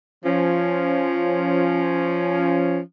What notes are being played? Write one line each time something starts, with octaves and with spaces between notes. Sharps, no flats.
F3 C#4